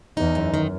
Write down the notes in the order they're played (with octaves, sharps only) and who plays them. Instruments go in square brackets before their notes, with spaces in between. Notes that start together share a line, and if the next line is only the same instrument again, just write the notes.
[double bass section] E2 [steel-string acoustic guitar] D#4
[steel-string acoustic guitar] F#2
D#3